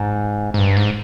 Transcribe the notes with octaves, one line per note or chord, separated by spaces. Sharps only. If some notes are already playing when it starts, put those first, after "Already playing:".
Already playing: G#2
G#2
G2
G#2